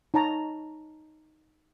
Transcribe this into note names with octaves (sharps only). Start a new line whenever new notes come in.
D#4 C#5 A5 A#5